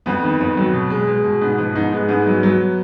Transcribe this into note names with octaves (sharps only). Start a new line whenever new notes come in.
F2 B3
D#3
F2
F#3
B2
G#3
G#3
B2
G#2 B3
F3 B3
G#2 D#4
G#3 B3
G#2 B3
F#3
F#3